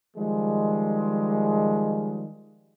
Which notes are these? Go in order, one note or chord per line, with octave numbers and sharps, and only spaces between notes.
D#3 F3 G3 G#3